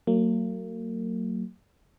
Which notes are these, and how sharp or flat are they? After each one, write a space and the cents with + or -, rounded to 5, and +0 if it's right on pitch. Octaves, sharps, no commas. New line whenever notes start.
F#3 +10 A#3 -35